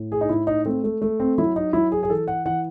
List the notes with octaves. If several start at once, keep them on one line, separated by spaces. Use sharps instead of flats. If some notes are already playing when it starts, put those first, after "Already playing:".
Already playing: A2
G#4
D#4
A2 E4
D#4
A3 C4
A3
A3
C4
F#3 E4
D#4
F#3 E4
G#4
G#4
E3 A4
F#5
E3 F#5